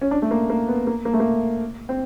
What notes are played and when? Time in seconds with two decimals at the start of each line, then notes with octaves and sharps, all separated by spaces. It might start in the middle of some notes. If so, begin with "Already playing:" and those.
0.01 C#4
0.11 D4
0.22 A3
0.31 A#3
0.50 A#3
0.68 B3
0.87 A#3
1.05 A#3
1.13 A3
1.20 A#3
1.89 C4